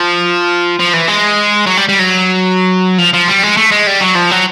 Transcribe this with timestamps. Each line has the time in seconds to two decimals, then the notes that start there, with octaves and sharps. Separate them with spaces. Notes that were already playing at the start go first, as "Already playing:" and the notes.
Already playing: F3
0.79 F3
0.93 E3
1.08 G#3
1.66 F#3
1.77 G3
1.89 G3
1.99 F#3
2.98 F3
3.13 F3
3.28 G3
3.43 G#3
3.57 A3
3.72 G#3
3.87 G3
4.01 F#3
4.16 F3
4.31 F#3